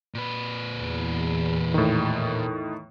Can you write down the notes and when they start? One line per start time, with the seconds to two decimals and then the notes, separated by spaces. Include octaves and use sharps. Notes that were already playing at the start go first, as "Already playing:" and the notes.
0.14 A#2 B4
0.77 E2
1.74 A2 D#3